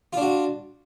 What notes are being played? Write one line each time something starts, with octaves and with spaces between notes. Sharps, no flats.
D4 F4 F#4